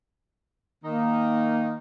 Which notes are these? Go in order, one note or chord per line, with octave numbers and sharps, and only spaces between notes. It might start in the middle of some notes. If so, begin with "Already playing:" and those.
D#3 A#3 D#4